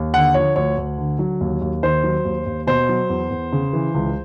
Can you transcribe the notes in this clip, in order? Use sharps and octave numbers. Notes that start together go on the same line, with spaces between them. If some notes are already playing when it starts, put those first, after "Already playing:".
Already playing: D#2
D3 F#5
F3 C#5
D2 C#5
D2
D3
F#3
D#2
D#2
D#3 C5
F#3
D#2
D#2
B2 C5
F#3
E2
E2
C#3
E3
C#2